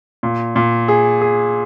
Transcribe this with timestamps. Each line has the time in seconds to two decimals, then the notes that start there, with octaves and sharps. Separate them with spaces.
0.23 A#2
0.56 A#2
0.88 G#4
1.21 G#4